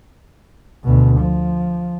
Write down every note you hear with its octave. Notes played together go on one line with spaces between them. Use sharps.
D2 B2
F3